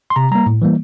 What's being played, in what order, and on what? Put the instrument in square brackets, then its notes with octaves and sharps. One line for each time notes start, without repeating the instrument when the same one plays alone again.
[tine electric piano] C6
C3 A#5
G3 A#3 A#5
A2
E3 G3 A#3